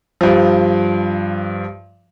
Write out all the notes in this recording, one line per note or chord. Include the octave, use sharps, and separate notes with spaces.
G2 F3